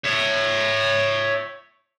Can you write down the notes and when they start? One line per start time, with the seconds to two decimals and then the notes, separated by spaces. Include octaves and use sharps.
0.04 C#5 E5